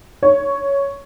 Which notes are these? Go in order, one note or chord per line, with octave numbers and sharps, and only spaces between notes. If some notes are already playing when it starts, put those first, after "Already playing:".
C#5